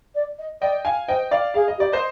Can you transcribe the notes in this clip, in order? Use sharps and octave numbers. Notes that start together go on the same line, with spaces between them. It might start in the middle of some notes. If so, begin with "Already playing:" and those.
D5
D#5
D5 D#5 G5
F5 G#5
C5 D#5 G5
D5 F5
G#4 F5
D#5
G4 D5
C5 D#5